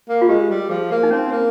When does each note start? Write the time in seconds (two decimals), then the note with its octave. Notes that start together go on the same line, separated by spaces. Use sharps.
0.09 A#3
0.22 F4
0.29 G#3 G4
0.50 G3
0.70 F3 G#4
0.91 A#3
1.03 D#4
1.11 C4 C#4
1.31 A#3